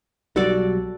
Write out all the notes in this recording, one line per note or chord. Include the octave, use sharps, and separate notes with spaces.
B1 F#3 G3 F#4 A4 D5